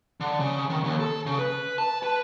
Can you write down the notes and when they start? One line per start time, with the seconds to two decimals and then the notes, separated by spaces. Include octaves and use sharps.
0.21 D3
0.40 C#3
0.70 D#3
0.84 D#2
1.00 A4
1.26 C#3
1.39 B4
1.78 A5
2.03 B4